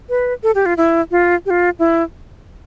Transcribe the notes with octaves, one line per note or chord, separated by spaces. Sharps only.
B4
A4
G4
F4
E4
F4
G4
F4
E4